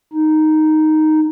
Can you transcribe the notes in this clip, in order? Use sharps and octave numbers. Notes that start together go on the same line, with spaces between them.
D#4